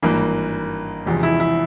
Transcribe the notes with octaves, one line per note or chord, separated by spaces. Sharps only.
G#1 G2 E3 A#3
E1 E2 C3 F3
E4
E4